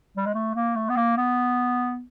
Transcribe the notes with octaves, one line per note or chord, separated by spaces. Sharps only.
G3
G#3
A3
A#3
A3
B3
A#3
B3